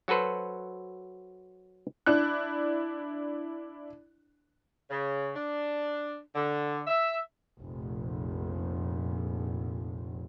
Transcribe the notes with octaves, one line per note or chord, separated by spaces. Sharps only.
F#3 F#4 A4 B4 C5
D4 E4 F#6
C#3
D4
D3
E5
F1 A#1